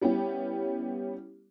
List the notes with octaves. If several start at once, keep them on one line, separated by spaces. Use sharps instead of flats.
G3 B3 C#4 E4 G4